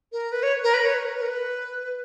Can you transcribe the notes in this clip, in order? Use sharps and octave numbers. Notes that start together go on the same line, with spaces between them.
A#4
B4
C#5
A#4
B4
C#5
B4
A#4
B4
A#4
B4